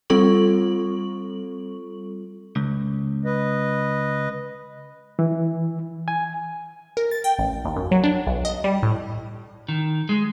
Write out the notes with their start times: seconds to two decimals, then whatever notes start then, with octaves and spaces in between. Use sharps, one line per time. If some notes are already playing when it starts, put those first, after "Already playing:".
0.10 G3 C4 F4 A4 C#6 F#7
2.56 C#2
3.25 B4 D#5
5.19 E3
6.08 G#5
6.97 A#4
7.12 A6
7.24 G5
7.38 A1
7.65 D#2
7.76 F#2
7.91 F#3
8.04 D4
8.27 B1
8.45 D#5
8.64 G3
8.83 A2
9.69 D#3
10.09 G#3